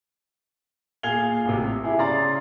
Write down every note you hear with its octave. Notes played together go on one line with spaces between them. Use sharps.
A#2 G#4 F5 G#6 F7 G7
A1 C3
E4 G#4
C#3 D5 A#5 C6 A6